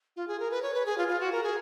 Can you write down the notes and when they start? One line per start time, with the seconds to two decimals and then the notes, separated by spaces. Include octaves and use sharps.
0.16 F4
0.28 G#4
0.40 A#4
0.51 B4
0.62 C#5
0.74 B4
0.86 G#4
0.98 F4
1.08 F4
1.20 F#4
1.32 A#4
1.43 G#4